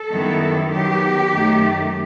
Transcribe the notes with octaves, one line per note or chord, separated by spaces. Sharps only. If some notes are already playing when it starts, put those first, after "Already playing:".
Already playing: A4
F#2 D#3 G3 B3 E4
D#3 F#3 B3 G4
F#2 D#3 A3